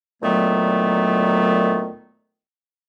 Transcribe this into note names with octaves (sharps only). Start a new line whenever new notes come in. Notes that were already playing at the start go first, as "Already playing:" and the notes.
D2 A#2 D#3 F#3 A3 B3